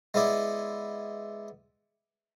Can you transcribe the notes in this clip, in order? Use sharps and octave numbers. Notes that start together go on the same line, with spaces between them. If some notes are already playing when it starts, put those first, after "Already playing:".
G#3 B3 E4 D5